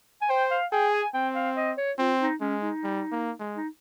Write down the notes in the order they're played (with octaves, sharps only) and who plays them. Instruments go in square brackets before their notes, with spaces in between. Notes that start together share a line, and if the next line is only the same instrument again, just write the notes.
[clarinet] G#5
[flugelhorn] C5 [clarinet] G5
[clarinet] F5
[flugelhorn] G#4 [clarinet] G5
[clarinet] G#5
[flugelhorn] C4 [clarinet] G5
[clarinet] F5
D#5
C#5
[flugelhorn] C4 [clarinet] F4
[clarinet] D#4
[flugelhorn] G#3 [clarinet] C#4
[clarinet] D#4
[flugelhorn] G3
A#3
G#3
[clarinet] D#4